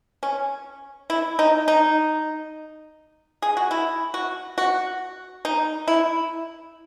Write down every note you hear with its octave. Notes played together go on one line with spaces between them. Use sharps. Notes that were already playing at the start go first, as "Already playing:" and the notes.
C#4
E4
D#4
D#4
G#4
F#4
E4
F#4
F#4
D#4
E4